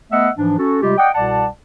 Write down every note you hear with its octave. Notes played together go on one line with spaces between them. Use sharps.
A3 B3 D#5 E5 F#5 E6
G#2 E3 F3 D4
C#4 F#4 A4
C3 G3 G#3 F4 G4
D5 D#5 F#5 G5
C2 B2 D5 F#5 A5